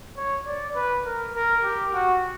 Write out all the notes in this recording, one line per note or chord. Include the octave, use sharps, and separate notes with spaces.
C#5
D5
B4
A#4
A#4
G4
F#4